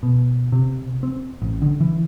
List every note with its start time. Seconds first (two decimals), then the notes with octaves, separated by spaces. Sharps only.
0.03 B2
0.52 C3
1.03 C4
1.42 A1
1.62 D3
1.81 E3